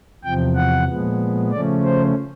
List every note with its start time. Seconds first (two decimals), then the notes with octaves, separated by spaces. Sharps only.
0.24 E2 C3 F3 G5
0.56 F#5
0.87 A#2 F3 G#3 B3
1.51 C#3 F3 A3 C#4 D5
1.83 C5